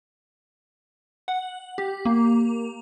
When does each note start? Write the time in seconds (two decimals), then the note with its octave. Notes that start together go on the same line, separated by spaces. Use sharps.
1.28 F#5
1.78 G4
2.05 A#3